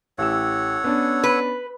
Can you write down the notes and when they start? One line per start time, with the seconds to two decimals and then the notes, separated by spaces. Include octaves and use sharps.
0.18 A1 G4 A4 C#5 F#5 E6
0.84 B3 C#4 D4
1.24 B4